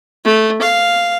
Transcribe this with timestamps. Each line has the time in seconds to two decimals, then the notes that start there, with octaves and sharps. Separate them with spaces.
0.25 A3
0.62 F5